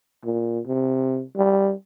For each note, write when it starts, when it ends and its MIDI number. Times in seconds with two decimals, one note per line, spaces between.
0.25 0.60 46
0.66 1.23 48
1.36 1.73 55